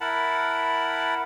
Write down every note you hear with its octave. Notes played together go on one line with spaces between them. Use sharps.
E4 A#4 F#5 A5 B5